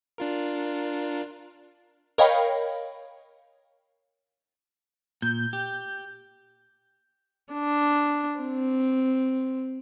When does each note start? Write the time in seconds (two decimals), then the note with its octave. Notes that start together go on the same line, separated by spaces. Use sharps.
0.18 D4 F4 A#4
2.18 A#4 C#5 D#5 F5 G5 B5
5.22 A#2 G6
5.53 G4
7.53 D4
8.40 C4